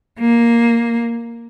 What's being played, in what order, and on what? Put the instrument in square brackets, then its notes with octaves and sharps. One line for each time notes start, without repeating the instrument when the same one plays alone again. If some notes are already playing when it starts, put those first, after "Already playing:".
[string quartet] A#3